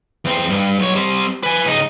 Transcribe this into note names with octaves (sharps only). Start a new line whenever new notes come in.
E2 C4
G2
B1 C#5
G3 C4
B4 G#5
C#2 D#4